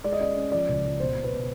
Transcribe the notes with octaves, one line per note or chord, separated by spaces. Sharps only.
G#3 D5
D#5
C#4 D5
C#4
F3 D5
C#2
C#2
B2 C5
B2
B4
B2